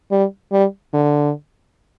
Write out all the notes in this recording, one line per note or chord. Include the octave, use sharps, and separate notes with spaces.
G3
G3
D3